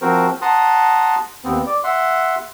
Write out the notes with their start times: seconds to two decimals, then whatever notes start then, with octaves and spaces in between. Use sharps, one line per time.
0.02 F3 C4 F#4 A#4 C5
0.42 F#5 A5 A#5 C6 D#6
1.44 D#2 B3 C4
1.66 D5
1.84 E5 F#5 C6